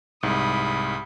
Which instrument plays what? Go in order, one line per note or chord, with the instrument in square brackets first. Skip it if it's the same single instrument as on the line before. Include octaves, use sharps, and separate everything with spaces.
[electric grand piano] C2 G#2 [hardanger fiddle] B5 D#6